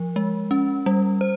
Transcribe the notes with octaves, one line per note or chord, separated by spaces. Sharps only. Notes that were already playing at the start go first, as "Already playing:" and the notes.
Already playing: F3 A#4
G#3
C#4
G3
C5